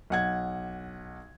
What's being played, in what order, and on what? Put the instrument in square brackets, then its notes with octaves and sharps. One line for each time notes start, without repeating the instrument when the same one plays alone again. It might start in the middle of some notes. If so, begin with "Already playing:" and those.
[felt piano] B1 F#5 G#6